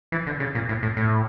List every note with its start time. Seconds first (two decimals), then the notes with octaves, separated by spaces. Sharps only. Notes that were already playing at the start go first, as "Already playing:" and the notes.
0.12 E3
0.27 D3
0.40 C#3
0.55 A#2
0.69 A2
0.83 A2
0.97 A2